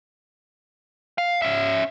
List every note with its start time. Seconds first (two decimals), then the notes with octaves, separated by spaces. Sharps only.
1.18 F5
1.42 C#4 E5